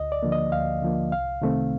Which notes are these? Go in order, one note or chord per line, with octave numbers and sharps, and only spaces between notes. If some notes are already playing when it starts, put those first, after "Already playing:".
Already playing: D2 D#5
D5
D3 F3 A#3
D#5
D2 F5
D3 F3 A#3
C2 F5
C3 D#3 A3 C4